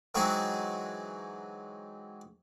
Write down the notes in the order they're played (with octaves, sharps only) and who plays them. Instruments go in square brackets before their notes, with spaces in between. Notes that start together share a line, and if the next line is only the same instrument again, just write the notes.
[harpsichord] E3 F#3 G#3 C4 D#4 G#4